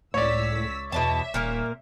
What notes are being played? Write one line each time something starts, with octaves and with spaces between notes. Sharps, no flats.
C#2 A2 C#5 D5 E6 B6
E2 B2 D#5 E5 A5
D#1 A#2 A#3 A#4